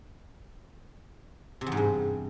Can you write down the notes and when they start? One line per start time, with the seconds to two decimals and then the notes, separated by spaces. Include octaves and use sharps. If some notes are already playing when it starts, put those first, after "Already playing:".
1.61 C3
1.66 E2
1.72 G#2
1.77 G2